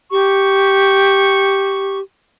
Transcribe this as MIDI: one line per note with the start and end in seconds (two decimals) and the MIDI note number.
0.11 1.99 67
0.11 1.99 85